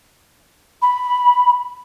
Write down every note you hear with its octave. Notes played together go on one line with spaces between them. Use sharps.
B5